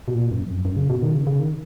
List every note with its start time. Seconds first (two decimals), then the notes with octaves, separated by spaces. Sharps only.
0.08 B2
0.14 A#2
0.31 F#2
0.42 F2
0.48 F#2
0.65 F#2
0.77 C#3
0.90 B2
1.02 D#3
1.15 C#3
1.27 C#3
1.40 D#3